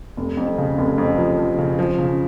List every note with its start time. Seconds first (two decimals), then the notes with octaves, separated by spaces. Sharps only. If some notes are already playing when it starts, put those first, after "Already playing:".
0.17 F1
0.37 F2
0.58 C#3
0.78 F1
0.98 F2
1.18 F3
1.38 F3
1.59 C#3
1.79 F3
1.98 C#3